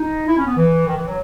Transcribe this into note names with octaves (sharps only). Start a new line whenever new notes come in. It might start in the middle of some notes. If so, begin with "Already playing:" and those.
Already playing: D#4
E4
C#4
B3
E3
D#3
E3
F#3